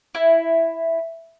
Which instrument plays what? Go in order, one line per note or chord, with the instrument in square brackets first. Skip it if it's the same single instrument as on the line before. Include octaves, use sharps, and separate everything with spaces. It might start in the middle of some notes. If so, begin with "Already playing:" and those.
[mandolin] E4